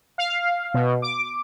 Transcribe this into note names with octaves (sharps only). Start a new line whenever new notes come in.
F5
B2
D6